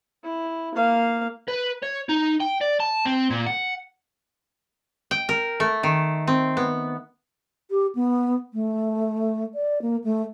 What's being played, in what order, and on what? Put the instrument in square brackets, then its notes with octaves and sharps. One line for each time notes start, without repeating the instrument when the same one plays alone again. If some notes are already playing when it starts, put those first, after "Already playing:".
[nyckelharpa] E4
A#3 F5
[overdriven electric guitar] B4
C#5
D#4
G5
D5
A5
C4
A#2
F#5
[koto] G5
A#4
A3
D#3
C4
B3
[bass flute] G4
B3
A3
D5
A#3
A3